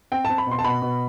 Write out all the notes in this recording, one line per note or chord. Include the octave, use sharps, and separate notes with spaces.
C4 G5
C4 A5
B5
B2 C6
A5
B2 B5
B2